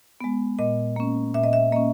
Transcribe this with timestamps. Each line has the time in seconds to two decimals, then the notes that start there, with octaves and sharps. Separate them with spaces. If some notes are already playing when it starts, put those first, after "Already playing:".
0.21 G#3 B3
0.59 A#2 D#5
0.96 A#3 C#4
1.34 A#2 E5
1.44 D#5
1.53 E5
1.72 A#3 C#4 D#5